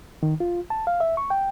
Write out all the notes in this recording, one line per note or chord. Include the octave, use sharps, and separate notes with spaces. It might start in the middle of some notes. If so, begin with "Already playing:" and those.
D#3
F4
A5
F5
E5
C#6
G5